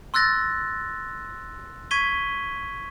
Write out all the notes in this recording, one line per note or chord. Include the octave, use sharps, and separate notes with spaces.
C6 E6 F#6 A6 A#6
C#6 G#6 B6 D#7 G7